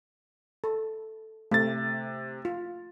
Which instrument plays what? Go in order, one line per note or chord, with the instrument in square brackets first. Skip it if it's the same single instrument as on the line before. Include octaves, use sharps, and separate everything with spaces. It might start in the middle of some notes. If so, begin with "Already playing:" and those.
[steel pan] A4
[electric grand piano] C3 A6 [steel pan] A3
[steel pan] F4